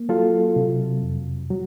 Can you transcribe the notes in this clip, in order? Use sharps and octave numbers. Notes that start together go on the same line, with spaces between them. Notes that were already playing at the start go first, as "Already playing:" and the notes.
Already playing: A#3
F#3 F4 A4
C3
F2
F#3